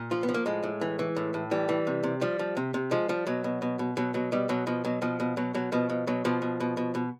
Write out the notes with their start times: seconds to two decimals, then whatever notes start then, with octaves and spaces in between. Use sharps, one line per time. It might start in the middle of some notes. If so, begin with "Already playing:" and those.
Already playing: A#2
0.11 F3 F4
0.23 B3
0.29 F3
0.34 A#3
0.46 A2 G#3
0.63 A2
0.81 E3
0.99 E3
1.16 A2
1.34 A2
1.51 E3 G3
1.69 E3
1.87 C3
2.03 C3
2.21 F3 G3
2.39 F3
2.57 C3
2.74 C3
2.91 F3 G#3
3.09 F3 G3
3.27 B2 F#3
3.44 B2
3.62 B2
3.79 B2
3.97 B2 F#3
4.14 B2 F#3
4.32 B2 G3
4.49 B2 F#3
4.67 B2 F3
4.85 B2 F#3
5.02 B2 F3
5.20 B2
5.37 B2 F#3
5.54 B2 F#3
5.72 B2 F3
5.90 B2
6.07 B2 F#3
6.25 B2 F3
6.42 B2
6.60 B2
6.77 B2
6.95 B2